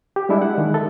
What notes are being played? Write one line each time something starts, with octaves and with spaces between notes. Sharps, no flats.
G4
G3 G#3 D4 E4
F#5
D#3 G#3
A4 E5